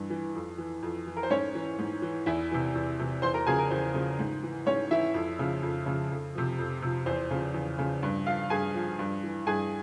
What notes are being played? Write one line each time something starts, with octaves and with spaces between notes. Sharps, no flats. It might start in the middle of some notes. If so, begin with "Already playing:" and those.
Already playing: G2 E3
E3
F2
E3
F2
E3
A#4
C5
G#2 C#4 C#5
E3
G#2
E3
E2 E4 E5
C3 E3
E2
C3 E3
E2 C5 C6
A#4 A#5
C#3 F3 G#4 G#5
A#4
E2 C5
C#3 F3
G#2
E3
G#2 C#4 C#5
E3 E4 E5
F2
C#3 F3
F2
C#3 F3
F2
C3 F3
F2
C3 F3
E2 C5
C#3 F3
E2
C#3 F3
G2
F3 F4 F5
G2 G#4 G#5
F3
G2
E3
G2 G#4 G#5